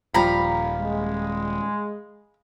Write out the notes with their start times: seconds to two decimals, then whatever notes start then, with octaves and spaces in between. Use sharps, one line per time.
0.14 D#1 F3 G3 F5 A#5 B5
0.80 G#3